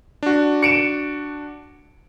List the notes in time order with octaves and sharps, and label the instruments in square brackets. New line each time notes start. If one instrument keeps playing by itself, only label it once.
[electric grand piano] D4 F#4
[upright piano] C#7 D7 E7